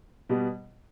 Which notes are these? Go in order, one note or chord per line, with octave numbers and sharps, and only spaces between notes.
B2 G3 B3